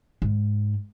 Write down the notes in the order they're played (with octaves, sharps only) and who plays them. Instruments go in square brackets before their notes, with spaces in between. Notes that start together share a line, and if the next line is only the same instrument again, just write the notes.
[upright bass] G#2